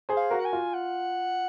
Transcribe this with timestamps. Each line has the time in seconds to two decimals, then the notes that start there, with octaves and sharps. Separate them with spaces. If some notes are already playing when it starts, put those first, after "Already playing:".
0.09 G#4 C5
0.17 F5
0.31 F#4 A#4
0.40 F#5
0.45 G#5
0.53 F4
0.74 F#5